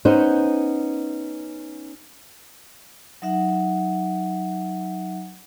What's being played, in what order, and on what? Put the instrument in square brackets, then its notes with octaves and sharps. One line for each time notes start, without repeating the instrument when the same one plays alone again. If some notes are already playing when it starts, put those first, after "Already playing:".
[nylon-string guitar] B3 C#4 D#4 C5
[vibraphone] F#3 D#4 E5 F#5